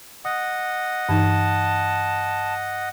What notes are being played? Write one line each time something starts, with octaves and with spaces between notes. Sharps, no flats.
D#5 F#5 D#6
G2 E3 D#4 A5